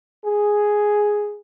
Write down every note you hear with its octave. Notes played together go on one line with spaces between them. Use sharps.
G#4